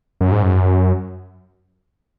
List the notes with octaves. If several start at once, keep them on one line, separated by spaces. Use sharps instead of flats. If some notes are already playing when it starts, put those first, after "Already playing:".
F#2
G#2
F#2